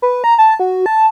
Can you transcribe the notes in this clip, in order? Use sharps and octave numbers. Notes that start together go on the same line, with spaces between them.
B4
A#5
A5
F#4
A5